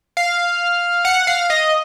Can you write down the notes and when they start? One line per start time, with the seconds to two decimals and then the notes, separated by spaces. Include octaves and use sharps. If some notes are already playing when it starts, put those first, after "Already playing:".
0.17 F5
1.05 F#5
1.27 F5
1.50 D#5